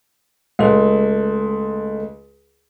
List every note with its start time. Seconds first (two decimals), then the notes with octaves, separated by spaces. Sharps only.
0.59 C#2 A3 A4